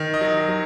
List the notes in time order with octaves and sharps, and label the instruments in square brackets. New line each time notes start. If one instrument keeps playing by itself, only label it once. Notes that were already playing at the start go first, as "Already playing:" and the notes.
Already playing: [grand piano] D#3
D#5
F#3
F#3